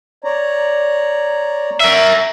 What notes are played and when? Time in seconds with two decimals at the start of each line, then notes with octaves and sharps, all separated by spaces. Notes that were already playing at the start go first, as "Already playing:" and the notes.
0.24 C#5 D5 A#5
1.80 A#4 E5